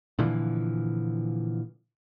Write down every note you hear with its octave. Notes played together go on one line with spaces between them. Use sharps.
A#2 D3 E3 F3